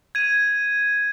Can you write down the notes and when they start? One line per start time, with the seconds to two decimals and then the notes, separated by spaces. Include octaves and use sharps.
0.15 G#6 D#7